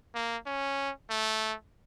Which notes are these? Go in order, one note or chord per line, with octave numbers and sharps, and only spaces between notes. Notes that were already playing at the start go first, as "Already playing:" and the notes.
A#3
C#4
A3